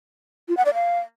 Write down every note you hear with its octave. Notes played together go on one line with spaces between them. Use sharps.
F4
F#5
D5
F5